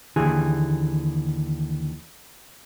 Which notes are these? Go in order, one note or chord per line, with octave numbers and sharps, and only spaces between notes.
D#2 D3 E3 G#4